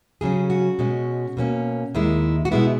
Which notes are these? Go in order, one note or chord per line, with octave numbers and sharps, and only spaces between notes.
C#3 F#3 C#4 G#4
F#4
B2 G#3 C#4
B2 A#3 C#4
D#2 D#3 G#3 E4
F#4
B2 G#3 B3 E4